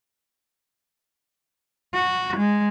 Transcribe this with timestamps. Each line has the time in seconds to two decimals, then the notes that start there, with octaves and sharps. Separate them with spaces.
1.94 F#4
2.37 G#3